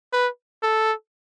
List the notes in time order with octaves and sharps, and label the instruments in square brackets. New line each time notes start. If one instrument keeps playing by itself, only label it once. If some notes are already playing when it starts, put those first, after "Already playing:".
[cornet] B4
A4